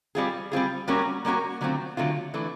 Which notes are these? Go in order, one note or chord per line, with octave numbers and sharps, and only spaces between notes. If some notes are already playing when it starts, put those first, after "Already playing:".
G3 C4 F4 G#4
G3 C4 F4 G#4
G3 A#3 C#4 F#4 A#4
G3 A#3 C#4 F#4 A#4
D3 F#3 A3 C4 F4
D3 F#3 A3 C4 F4
E3 A3 D4